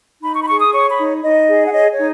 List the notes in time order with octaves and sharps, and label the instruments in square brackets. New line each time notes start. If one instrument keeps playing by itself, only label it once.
[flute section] D#4 B5
C#6
B5
G#4 C#6
D#6
C#5 C#6
B5
D#4
D#4 D#5
G#4
F#5
C#5 D#5
C#5
D#4